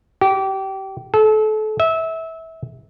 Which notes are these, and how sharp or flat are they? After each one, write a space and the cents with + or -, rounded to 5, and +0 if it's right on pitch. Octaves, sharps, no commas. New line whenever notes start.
G4 -25
A4 -30
E5 -20